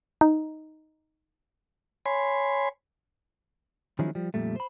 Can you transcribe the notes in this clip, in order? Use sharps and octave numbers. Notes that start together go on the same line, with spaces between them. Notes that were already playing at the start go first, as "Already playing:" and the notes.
D#4
C#5 G#5 B5 C6
D#3 F3 F#3 G#3 C#4 E4
F3 G3
F2 A#2 G3 A3
C5 B5